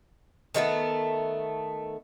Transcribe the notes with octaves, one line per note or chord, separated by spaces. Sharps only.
D#3 G3 A3 B3